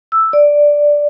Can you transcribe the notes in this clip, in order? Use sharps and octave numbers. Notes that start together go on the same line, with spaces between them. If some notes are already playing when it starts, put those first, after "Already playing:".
E6
D5